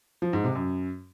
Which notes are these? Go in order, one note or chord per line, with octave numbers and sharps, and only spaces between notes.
F3
G#2
C3
F#2